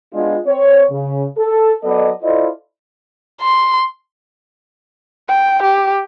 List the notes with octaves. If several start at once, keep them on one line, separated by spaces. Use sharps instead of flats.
G#3 B3 D4 F4
C4 C#5
C#3
A4
F#3 B3 A4 D5 D#5
E4 F4 A4 C5 D5 D#5
C6
G5
G4